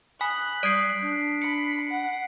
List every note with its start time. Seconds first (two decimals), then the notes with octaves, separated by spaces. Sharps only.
0.21 G#5 B5 D#6 F#6 B6
0.63 G3 D5 D#6 G#6 C7 D7
1.01 D4
1.42 B5 C#7
1.90 F#5